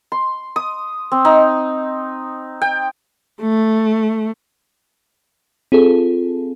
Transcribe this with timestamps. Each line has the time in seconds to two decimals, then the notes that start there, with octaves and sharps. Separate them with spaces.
0.12 C6
0.56 D#6
1.12 C4
1.25 D#4
2.62 G5
3.42 A3
5.72 C4 F4 G#4 A4